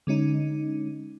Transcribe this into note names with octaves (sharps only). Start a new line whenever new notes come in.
D3 G#3 C#4 D#4